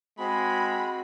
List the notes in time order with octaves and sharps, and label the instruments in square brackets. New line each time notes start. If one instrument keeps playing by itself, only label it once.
[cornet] G#3 [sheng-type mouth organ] C4 F#4 [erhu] B5